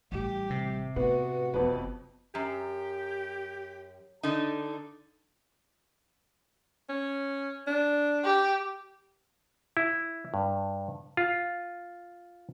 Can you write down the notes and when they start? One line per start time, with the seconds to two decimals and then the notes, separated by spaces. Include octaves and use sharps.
0.12 A1 G3 G4
0.50 C3
0.96 A2 B3 F#4
1.54 F#1 F2 B3 B4
2.35 F#2 G4
4.23 D3 D#4
6.89 C#4
7.67 D4
8.25 G4
9.77 E4
10.34 G2
11.17 F4